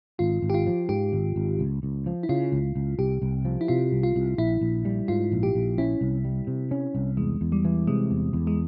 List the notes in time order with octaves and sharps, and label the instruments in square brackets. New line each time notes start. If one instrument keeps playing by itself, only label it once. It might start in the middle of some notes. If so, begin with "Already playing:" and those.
[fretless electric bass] G#1 [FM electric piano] F4
[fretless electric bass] G#1
[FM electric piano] G4
F4
[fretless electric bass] F3
[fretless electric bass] G#2 [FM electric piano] G4
[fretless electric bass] G#1
G#1
C#2
C#2
F3
[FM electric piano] E4
[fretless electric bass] C#3 [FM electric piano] F4
[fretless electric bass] C#2
C#2
[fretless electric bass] C2 [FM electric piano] G4
[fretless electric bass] C2
F3
[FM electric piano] E4
[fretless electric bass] C3 [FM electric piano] F4
[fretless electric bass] C2
[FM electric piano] F4
[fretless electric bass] C2
[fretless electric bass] A#1 [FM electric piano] E4
[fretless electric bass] A#1
G3
[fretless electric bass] G#2 [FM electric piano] F4
[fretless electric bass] A#1
[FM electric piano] G4
[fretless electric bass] A#1
[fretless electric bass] C#4 [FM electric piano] E4
[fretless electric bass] C2
G3
C3
C#4
C2
[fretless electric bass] E2 [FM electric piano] G#3
[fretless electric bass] E2
[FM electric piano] G3
[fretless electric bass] E3
[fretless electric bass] C3 [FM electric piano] G#3
[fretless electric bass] E2
E2
[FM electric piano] G#3